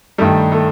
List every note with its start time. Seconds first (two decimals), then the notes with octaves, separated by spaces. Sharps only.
0.18 G2 D#3 G3 A3
0.52 A3